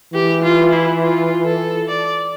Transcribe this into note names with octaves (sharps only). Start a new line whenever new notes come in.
E3 G4
F4
E4
F4
A4
D5